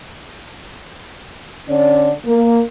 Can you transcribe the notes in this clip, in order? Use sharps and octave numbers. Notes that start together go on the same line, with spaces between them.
D3 C#4 D5
A#3